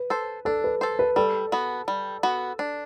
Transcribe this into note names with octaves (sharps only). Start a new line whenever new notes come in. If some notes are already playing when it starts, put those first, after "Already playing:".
Already playing: B4
A4 C5
D4 A4
B4
A4 C5
B4
G3 A4
B3 F#4
G3
B3 F#4
D4